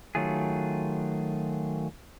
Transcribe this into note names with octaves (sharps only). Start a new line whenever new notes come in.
D#3 F#3 A3 F4 G#4